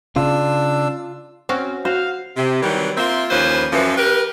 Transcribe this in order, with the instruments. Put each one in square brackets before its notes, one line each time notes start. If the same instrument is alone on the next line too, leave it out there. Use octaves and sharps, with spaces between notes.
[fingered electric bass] C#3 [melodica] D4 E6 [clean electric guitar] F4
[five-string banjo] C4 [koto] C#4 F#4 F5
[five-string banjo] F#4 [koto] C5 [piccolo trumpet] F5
[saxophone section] C3
D#3 E3 F#3 G3 C4
A#3 C4 F4 E5
D#2 E3 F3 C#4 B4 C5
F#2 E3 F3
G4 A#4 B4